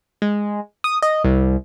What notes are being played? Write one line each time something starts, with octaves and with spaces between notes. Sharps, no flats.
G#3
D#6
D#5
C2